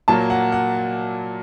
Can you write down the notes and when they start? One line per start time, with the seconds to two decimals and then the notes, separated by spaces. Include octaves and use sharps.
0.08 A#2 F#3 A#3 A5
0.30 F#5
0.52 F#5